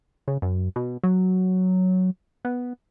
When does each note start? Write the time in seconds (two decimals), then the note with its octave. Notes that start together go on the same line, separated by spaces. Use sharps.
0.28 C#3
0.42 F#2
0.76 B2
1.03 F#3
2.45 B3